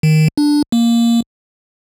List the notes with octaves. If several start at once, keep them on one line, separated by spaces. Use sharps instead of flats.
D#3
D4
A#3